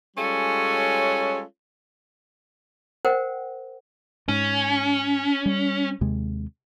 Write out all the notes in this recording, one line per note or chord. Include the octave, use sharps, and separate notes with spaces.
G3 G#3 C#4 F4 A4 C#5
A#4 C5 F#5 G5
G#2 C#4
G3
D#2 C3 G#3